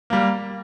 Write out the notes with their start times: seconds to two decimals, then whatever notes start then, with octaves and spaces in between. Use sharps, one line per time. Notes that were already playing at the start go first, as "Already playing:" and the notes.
0.10 G3 A#3